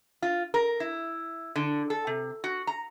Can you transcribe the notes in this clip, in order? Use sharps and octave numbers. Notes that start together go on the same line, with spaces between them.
F4
A#4
E4
D3
A4
C3
F#4
A#5